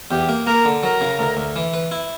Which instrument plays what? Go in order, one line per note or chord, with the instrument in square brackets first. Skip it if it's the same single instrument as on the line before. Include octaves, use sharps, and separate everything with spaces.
[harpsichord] E2 [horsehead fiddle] G4
[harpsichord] A#3
[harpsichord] A#3 [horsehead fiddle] A#4
[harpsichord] D3
[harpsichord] F#3 [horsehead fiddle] A#4
[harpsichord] C#3
D2
D2
E3
B4
E4